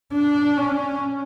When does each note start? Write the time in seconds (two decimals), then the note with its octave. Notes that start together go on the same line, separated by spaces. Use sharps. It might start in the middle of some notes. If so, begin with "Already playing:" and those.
0.13 D4
0.57 C#4